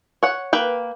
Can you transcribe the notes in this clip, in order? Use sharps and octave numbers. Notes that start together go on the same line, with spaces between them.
C#5 F#5
A#3 B4 G5